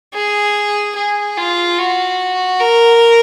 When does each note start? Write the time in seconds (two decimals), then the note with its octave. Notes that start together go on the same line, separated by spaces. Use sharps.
0.14 G#4
0.96 G#4
1.37 F4
1.79 F#4
2.60 A#4